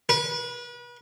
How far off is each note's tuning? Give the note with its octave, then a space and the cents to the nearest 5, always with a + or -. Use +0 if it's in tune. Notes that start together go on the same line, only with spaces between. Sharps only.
B4 -35